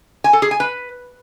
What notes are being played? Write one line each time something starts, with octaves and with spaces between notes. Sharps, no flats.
G#5
A4
G#4
G#5
B4